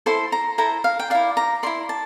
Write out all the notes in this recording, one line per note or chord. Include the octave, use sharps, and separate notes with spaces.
E4 A4 C5 C6
A#5
E4 A4 C5 A#5
F5
G5
E4 A#4 D5 F5
A#5
E4 A#4 D5 C6
A5